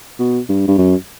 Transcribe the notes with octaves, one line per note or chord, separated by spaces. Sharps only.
B2
G2
G2
F#2